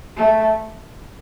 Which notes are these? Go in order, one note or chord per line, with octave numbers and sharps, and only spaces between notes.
A3